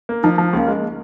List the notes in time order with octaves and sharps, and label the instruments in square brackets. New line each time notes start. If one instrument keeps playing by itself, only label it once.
[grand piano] A#3
[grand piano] F3 [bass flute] D#4
[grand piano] F3
[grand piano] C#2 [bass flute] A#3
[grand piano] G#3